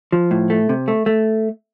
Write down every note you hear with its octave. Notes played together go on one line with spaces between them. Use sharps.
F3
A2
A3
C3
A3
A3